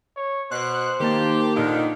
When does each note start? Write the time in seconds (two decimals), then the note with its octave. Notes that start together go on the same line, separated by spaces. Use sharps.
0.16 C#5
0.51 B2 C5 F#6
1.00 D#3 A#3 G4 A5
1.56 A#2 D3 D#3 F3 D#4